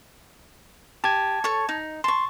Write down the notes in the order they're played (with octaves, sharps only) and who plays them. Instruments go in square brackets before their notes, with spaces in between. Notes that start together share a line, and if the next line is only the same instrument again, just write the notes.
[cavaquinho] G4 [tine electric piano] A5 G#6
[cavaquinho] A4 C#5 C#6
D#4
[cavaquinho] A5 C#6 [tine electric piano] C6